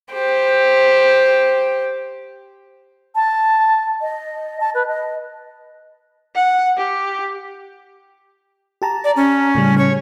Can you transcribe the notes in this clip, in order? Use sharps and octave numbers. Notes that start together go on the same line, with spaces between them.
G4 C5
A5
D#5
A5
B4
D#5
F#5
G4
G4 A5 A#5
D5
C#4
A2 C#3 G3
C#5